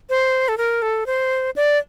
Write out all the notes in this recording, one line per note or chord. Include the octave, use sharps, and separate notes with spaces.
C5
A4
A#4
A4
C5
D5